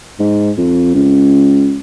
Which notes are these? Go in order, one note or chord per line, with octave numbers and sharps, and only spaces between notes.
G#2
F2
C#2